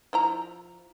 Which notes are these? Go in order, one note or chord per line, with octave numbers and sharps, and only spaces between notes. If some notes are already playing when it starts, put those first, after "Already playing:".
F3 E4 A#5